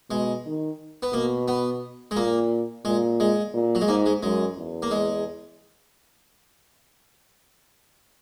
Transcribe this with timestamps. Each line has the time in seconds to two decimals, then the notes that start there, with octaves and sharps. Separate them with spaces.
0.10 B2 G#3
0.46 D#3
1.02 B3
1.13 B2 A#3
1.48 B3
2.11 G#3
2.16 A#2 A#3
2.85 A#2 G#3
3.20 G#3
3.54 A#2
3.75 F#3
3.81 G#3
3.88 G#2 A#3
4.06 G#3
4.22 F#2 G#3
4.58 E2
4.82 A#3
4.91 G#3